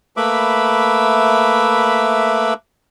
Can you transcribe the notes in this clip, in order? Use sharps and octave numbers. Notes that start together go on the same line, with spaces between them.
A3 A#3 B4 E5 B5 D6